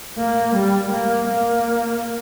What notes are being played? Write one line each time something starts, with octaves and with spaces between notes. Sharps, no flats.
A#3
G3
A#3
A#3